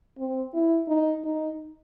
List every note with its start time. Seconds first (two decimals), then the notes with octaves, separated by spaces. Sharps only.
0.18 C4
0.54 E4
0.88 D#4
1.24 D#4